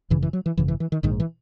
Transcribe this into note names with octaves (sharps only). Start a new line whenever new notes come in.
G#1 F#2 C#3 E3
E3
F#3
E3
G#1 F#2 C#3 E3
E3
E3
D#3
A#1 G#2 D#3
E3